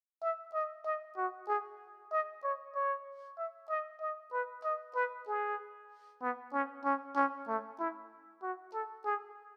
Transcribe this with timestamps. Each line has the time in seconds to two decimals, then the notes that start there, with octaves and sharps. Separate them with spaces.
0.22 E5
0.54 D#5
0.85 D#5
1.17 F#4
1.48 G#4
2.12 D#5
2.43 C#5
2.75 C#5
3.38 E5
3.69 D#5
4.01 D#5
4.32 B4
4.64 D#5
4.95 B4
5.27 G#4
6.21 B3
6.53 C#4
6.85 C#4
7.16 C#4
7.48 A3
7.79 E4
8.42 F#4
8.73 A4
9.05 G#4